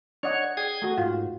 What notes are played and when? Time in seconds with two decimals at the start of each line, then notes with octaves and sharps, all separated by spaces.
0.23 D4 C#5 D#5 F#5
0.57 G#4 G5 D#6 G#6
0.82 A3 F#4
0.98 G#2 F4